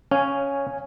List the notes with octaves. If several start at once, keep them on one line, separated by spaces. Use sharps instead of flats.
C#4 C#5 F5 G#5